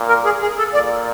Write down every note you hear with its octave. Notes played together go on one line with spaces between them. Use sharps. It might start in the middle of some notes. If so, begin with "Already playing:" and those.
Already playing: A#2
A#4
G#4
G#4
A4
A#2 D5